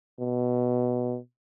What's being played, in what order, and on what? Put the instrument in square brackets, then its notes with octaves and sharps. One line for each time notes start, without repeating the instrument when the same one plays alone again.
[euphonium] B2